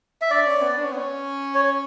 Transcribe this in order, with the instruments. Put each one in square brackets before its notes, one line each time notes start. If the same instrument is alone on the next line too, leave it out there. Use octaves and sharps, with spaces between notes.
[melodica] E5
[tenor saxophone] D4 [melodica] D5
[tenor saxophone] C#4
B3
D4
C#4
B3
C#4
[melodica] C#5